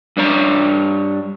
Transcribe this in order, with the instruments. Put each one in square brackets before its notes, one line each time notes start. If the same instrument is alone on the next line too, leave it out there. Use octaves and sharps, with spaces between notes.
[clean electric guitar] G2 D4 C#5 A#5